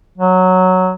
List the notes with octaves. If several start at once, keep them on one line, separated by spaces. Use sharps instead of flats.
F#3